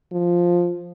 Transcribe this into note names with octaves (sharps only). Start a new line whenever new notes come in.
F3